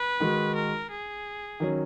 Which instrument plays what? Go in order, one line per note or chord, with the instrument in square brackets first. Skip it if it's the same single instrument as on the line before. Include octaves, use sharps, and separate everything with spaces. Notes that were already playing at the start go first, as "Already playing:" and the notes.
Already playing: [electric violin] B4
[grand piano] D#3 G#3 D#4 F#4
[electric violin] A#4
G#4
[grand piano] D#3 F#3 C#4